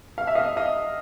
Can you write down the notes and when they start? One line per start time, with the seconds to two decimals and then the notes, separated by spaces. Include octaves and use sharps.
0.18 F5
0.27 E5
0.35 D#5 F5
0.57 D#5 F5